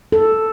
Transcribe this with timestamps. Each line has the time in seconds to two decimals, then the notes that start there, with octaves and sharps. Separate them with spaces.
0.12 A4